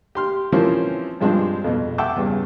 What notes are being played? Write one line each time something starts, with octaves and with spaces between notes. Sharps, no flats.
G4 C6 F6
E3 F3 A#3 C4 C#4
G2 F3 G#3 C4 D4
F2 B2
E5 F#5 G5 A5 D6 E6
E2 G2 C#3